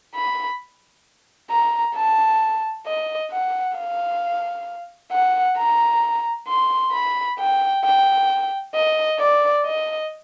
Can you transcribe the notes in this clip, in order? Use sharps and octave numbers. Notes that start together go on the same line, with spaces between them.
B5
A#5
A5
D#5
F#5
F5
F#5
A#5
C6
B5
G5
G5
D#5
D5
D#5